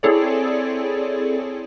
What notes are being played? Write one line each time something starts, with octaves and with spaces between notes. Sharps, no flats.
C4 E4 G#4 A4 C#5 D5